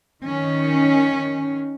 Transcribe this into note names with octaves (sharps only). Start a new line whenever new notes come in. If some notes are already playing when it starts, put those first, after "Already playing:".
D#3 C#4